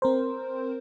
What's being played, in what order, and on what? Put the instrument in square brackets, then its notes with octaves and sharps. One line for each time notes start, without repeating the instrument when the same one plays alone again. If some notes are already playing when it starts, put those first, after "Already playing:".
[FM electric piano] C4 A#4 C5